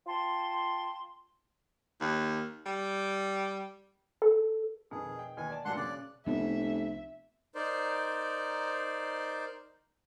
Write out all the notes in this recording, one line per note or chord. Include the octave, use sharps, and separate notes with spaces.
F4 G5 A5 C6
D#2
G3
A4
F2 B2 D#3 G#4
D#5 G5
D#2 E3 G5 G#5
D5 A5
G2 A#2 F#3 D4 F#5 C6
C#3 C#4 D5 F#6
F1 C2 B3 D4 E5
D#4 A#4 C5 D5